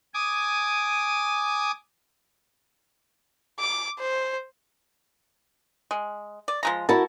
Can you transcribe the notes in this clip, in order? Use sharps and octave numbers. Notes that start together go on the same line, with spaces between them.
G#5 D6 D#6
D6
C5
G#3
D5
F3 G#3 A#5
E4 F#4 A#4 A5